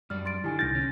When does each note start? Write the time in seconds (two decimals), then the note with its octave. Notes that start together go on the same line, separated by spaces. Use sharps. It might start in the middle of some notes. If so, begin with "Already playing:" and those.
0.10 F#2 G3 D5 F6
0.25 C6 A6 D7
0.44 D3 D#3 E4 G4 G#5
0.59 C2 F6 G6 A6 A#6
0.75 C#4